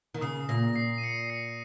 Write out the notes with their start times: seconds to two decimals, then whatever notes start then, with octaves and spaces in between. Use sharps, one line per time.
0.14 D#3
0.21 C#3 D#6
0.49 A#2 A#6
0.76 C7
0.98 D#7
1.04 C#7
1.30 C7
1.49 C7